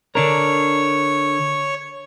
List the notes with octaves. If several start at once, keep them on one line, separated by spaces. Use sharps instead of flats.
D3 D4 A#4 C#5